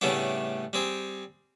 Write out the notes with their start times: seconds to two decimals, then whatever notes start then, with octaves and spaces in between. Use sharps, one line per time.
0.01 A2 C#3 G3 A3 B3 D4
0.73 G3 C4 G#4